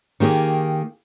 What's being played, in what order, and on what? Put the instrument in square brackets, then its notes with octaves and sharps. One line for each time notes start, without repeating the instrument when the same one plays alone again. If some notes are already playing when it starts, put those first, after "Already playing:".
[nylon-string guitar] D#3 A#3 G4 G#4